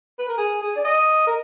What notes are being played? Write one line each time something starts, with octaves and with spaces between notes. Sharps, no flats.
B4
A#4
G#4
G#4
D5
D#5
A#4